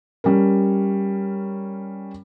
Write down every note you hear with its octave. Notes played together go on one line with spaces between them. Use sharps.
G3 C#4 A#4